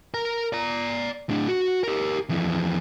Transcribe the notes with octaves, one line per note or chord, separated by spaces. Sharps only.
A#4 A#5
D5 A#5
A2 D4
F#4
G4 A#4
F2 E3